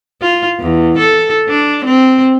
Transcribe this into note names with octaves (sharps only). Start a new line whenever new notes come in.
F4
E2
A4
D4
C4